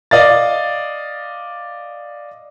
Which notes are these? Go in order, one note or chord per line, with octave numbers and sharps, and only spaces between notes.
D5 D#5 F5 A6